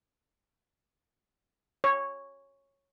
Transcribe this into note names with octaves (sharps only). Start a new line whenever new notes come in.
C#5